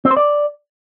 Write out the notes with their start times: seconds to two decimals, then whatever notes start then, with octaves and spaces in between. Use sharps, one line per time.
0.05 C4
0.11 C5
0.17 D5